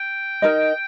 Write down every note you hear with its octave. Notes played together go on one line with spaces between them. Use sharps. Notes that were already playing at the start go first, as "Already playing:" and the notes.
Already playing: G5
D#4 A#4 D#5